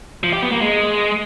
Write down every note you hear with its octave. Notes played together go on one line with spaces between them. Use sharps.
F3
G4
B3
A#3
G#3